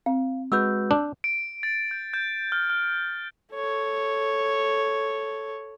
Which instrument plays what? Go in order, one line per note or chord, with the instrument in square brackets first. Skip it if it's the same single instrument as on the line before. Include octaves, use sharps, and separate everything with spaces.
[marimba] C4 [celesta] F5
[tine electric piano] G#3 F#4 B4 [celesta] E6 G6
[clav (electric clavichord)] D4
[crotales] D7
A6
G6
G6
F6
F6
[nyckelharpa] A4 C#5